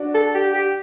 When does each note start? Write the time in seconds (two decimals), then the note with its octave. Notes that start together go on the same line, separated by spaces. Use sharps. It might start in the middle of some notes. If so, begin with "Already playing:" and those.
Already playing: D4 F#4
0.14 A4
0.34 G4
0.53 G4